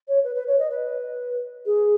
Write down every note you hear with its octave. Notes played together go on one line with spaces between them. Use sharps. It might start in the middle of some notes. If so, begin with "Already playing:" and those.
C#5
B4
B4
C#5
D#5
B4
G#4